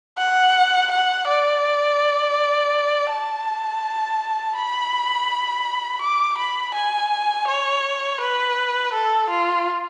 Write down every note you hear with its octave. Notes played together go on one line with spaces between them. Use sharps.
F#5
F#5
D5
A5
B5
D6
B5
G#5
C#5
B4
A4
F4